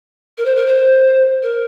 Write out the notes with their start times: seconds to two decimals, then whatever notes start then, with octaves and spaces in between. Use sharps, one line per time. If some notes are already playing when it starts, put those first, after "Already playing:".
0.38 A#4
0.45 C5
0.56 A#4
0.67 C5
1.43 A#4